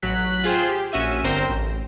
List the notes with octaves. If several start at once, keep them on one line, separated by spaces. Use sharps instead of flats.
A1 F#3 F#6 B6
F4 G#4 C5 G5
G4
A#1 C#4 F#4 E5 D#7
G1 D3 C4 A#4 C5 G5
A1